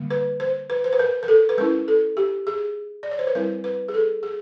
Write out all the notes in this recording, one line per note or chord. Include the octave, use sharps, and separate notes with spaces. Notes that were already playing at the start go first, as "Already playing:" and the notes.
Already playing: D3 G3 A#3
B4
C5
B4
C5
B4
A#4
A#4
A4
B4
G#3 C#4 E4 A#4
A4
G4
G#4
D5
C#5
C5
B4
G3 C4 E4 A#4
B4
G#4
A4
G#4